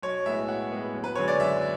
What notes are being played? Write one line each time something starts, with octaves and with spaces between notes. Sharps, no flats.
B1 C#5
A2 G#3 B3 E5
B1 F#5
A2 G#3 B3
F#1
B4
F#2 D3 G#3 C#5
D5
F#1 E5